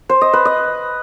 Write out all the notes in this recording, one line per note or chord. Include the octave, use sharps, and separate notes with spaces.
C5
D#5
B4
D#5